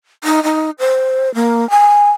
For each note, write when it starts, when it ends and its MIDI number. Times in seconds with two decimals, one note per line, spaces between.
0.24 0.43 63
0.44 0.70 63
0.79 1.33 72
1.35 1.68 58
1.70 2.10 80